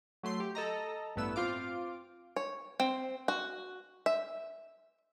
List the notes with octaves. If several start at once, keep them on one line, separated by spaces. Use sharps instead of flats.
F#3 A3 C6
G4
A4 D#5 A#5
A1 G2 A3 B3 E6
C4 F4 F5 D6
C#5
C4
F#4
E5